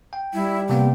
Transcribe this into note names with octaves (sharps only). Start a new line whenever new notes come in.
G5
G3 E4
C3 A#3 B3 G5